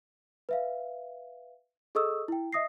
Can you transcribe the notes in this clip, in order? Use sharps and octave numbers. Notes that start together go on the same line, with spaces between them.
B4 E5 F5
G#4 A4 D#5 C#6 D#6 E6
E4 G5
D#5 E5 D#6 A#6 C7